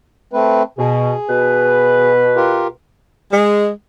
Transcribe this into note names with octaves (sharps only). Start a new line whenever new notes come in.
A3 C4 B4
B2 G#4
B2 B4
F4 G4 A#4
G#3